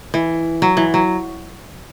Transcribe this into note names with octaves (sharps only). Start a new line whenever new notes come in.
E3
F#3
E3
F#3